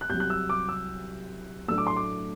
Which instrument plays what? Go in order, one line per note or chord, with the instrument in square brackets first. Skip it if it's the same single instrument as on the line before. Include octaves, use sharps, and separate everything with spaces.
[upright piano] F#6
C2 C3 F#3 G6
F#6
E6
D6
E6
A2 F#3 A3 D4 E6
D6
C6
D6